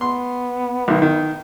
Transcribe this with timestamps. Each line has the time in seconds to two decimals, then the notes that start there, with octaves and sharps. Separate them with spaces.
0.01 B3 C6
0.88 B1 D#3
1.02 D#3